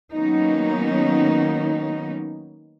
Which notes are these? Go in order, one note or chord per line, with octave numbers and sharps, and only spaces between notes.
D#3 F#3 A#3 B3 C#4 D#4